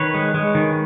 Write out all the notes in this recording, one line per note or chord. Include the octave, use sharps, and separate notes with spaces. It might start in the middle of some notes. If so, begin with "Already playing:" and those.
Already playing: D#3 B4 C#5
G#3
G#3
D#3